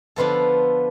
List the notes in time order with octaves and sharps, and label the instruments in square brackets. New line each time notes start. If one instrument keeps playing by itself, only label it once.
[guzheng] D3 F3 B3 F4 A4